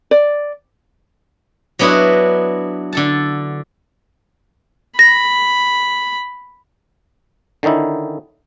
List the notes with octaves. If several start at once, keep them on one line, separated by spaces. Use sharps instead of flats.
D5
F#3 B3 D4 E4 F#4 D#5
D3 A4 A5
B5 A#6
D3 D#3 C#4 D#4 E4